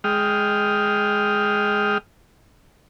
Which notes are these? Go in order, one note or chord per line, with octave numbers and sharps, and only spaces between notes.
G#3 G5 D#6 F6